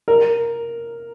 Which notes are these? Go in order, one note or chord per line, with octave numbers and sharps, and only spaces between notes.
A#4